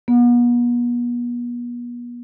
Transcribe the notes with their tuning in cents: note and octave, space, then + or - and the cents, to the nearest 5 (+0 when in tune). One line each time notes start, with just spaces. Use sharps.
B3 -40